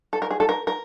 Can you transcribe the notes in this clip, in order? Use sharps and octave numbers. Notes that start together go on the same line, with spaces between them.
A4
A#4
G#4
A4
A#4
A#4